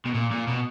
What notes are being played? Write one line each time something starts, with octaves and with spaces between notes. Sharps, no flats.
B2
A#2
A#2
B2